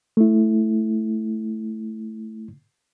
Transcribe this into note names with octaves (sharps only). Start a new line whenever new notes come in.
A3 E4